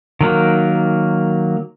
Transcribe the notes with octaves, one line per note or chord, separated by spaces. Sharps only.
D#3 F#3 A#3